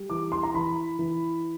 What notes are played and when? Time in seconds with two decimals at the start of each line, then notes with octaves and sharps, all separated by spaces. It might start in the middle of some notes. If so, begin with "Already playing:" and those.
Already playing: G3
0.10 E3 D6
0.32 C6
0.43 A#5
0.54 E3 B5
0.99 E3